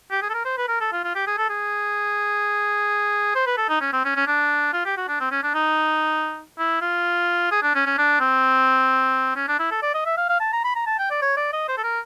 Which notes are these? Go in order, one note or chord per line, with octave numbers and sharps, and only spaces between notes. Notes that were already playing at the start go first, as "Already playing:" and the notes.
G4
G#4
A4
A#4
C5
B4
A#4
A4
F4
F4
G4
G#4
A4
G#4
C5
B4
A4
D#4
C#4
C4
C#4
C#4
D4
F4
G4
F#4
D4
C4
C#4
D4
D#4
E4
F4
G#4
D4
C#4
C#4
D4
C4
C#4
D4
E4
A4
D5
D#5
E5
F5
F5
A5
A#5
B5
A#5
A5
G5
D5
C#5
D5
D#5
C5
A4
A#4